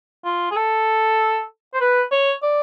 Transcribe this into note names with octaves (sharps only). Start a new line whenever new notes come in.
F4
G#4
A4
C5
B4
C#5
D5